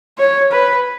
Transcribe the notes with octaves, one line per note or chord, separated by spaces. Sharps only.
C#5
B4